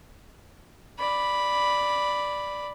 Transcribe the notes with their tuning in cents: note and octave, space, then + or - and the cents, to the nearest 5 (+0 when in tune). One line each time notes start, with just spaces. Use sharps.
D5 +0 B5 +0